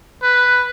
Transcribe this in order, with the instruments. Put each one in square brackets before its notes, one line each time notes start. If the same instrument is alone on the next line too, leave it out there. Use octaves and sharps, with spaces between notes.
[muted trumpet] B4